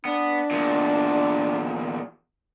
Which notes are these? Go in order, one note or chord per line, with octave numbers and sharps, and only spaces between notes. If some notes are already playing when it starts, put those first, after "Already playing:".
B3 D4
E2 A#2